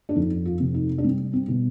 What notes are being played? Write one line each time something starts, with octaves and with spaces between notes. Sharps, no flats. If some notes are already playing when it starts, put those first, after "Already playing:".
D4
F2 D#4
F4
C3
D#4
D4
G3 C4
C4
B2